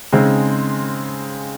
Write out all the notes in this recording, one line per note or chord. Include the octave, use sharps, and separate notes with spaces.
C#3 G#3 C4 D#4 G#4